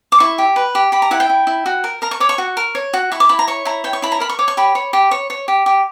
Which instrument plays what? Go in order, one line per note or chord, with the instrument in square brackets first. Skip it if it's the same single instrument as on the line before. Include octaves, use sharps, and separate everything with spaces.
[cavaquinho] D6
E4 C#6
G4
B4
G4
G4 B5
A#5
E4 F#5
G5
E4
E4
F#4
A#4
A#4 A#5
C#6
C#5 D6
C#6
F#4
A#4
C#5
F#4
E4 C#6
D6
E4 B5
A#5
C#5 C#6
E4 A#5
C#5 G5
C#6
E4 B5
A#5
A#4 B5
C#6
C#5 D6
C#6
G4 B5
C#5
G4
C#5
C#5
G4
G4